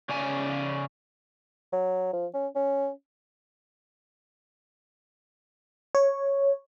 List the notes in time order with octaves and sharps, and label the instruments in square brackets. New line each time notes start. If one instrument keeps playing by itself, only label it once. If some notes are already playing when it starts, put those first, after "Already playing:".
[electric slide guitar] C#3 C#4 D5 G#5
[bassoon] F#3
F3
C#4
C#4
[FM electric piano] C#5